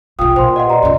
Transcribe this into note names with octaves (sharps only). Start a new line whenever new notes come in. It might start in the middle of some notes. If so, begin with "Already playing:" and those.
A#1 F3 F4 F5 G5 D#6
A#2 C5 G#5 C6
G4 B4 D#5 F#5 C6
G4 D5 D#5 A#5
F2 C#3